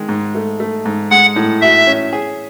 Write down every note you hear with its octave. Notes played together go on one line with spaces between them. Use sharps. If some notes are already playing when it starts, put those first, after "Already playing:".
Already playing: D#3 G#3
G#2
A3
A3
G#2
G#3 F#5
A2
F#4 E5
C#4
G#4